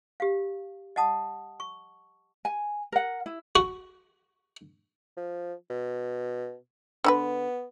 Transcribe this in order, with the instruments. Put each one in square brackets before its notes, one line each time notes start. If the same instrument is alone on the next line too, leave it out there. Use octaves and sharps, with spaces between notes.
[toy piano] G4 F5
D#5 F#5 A5 D#6
C#6
[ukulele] G#5
A#4 F#5
E4
[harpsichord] F#4
[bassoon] F3
B2
[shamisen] D3 E4 B4 [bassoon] B3